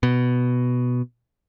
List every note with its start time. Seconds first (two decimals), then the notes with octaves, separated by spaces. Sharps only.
0.03 B2